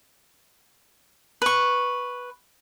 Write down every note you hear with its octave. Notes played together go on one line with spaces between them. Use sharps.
B4 C#6